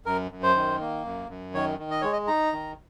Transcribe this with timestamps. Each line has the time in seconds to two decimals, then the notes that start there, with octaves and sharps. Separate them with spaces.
0.06 F#2 A#4
0.32 F#2
0.43 C5
0.56 D#3
0.81 A#3
1.05 F#2
1.29 F#2
1.54 D#3 C#5
1.79 D#3
1.91 D#5
2.01 G#3 C#5
2.13 D#5
2.27 D#4 A#5
2.53 D#3